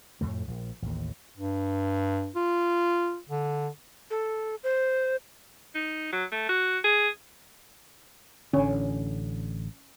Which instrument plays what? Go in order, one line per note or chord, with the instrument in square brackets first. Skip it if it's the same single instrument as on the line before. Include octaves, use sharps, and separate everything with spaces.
[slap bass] F2 A2 A3
A#1
A1 D#2
[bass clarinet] G2
F4
D3
[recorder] A4
C5
[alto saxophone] D#4
F#3
A3
F#4
G#4
[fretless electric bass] A1 D3 [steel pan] C#4